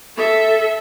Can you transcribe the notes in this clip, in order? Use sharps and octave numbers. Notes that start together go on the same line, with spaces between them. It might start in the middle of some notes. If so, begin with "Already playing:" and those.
A4 E5